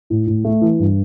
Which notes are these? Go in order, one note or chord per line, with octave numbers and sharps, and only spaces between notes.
A2
A2
A3
E3
G2